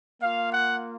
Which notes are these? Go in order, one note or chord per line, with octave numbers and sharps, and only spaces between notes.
A#3 F4 F5
F#5